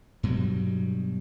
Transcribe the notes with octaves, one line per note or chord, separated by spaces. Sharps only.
G2 B2 F#3 G3